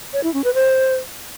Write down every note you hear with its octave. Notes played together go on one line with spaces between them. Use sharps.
C#5
E4
C#4
B4
C5